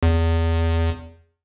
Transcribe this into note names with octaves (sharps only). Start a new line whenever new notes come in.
E2